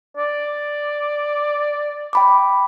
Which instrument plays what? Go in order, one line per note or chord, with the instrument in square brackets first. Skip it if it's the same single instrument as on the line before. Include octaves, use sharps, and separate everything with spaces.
[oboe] D5
[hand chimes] G5 B5 D6